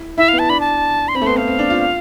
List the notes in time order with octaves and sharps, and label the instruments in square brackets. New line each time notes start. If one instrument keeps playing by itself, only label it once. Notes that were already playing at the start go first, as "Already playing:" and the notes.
Already playing: [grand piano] E4
[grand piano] E4 [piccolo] E5
[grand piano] B3 [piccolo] F5
[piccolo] A5
[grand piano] D4 [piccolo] B5
[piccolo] A5
C6
[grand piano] C4 [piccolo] B5
[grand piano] A3
[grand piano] B3 [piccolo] C6
[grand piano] B3 [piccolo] F5
[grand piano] C4
D4
F4